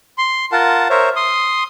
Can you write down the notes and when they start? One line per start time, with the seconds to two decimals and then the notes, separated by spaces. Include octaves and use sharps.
0.18 C6
0.52 F4 A#4 F#5 A5
0.90 A#4 C5 C#5 E5
1.16 C6 D#6